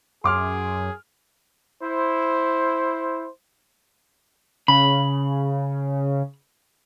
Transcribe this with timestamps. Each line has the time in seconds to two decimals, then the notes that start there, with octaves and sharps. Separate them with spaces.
0.24 F#2 G#4 C6 D6 F6
1.83 E4 C5
4.68 C#3 B5